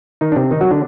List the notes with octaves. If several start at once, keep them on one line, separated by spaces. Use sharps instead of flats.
D#3 D#4
D4
C3 C4
D#3 D#4
F#3 F#4
D3 D4